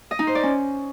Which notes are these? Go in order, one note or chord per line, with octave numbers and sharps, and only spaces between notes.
D#5
D#4
C5
D5
C#4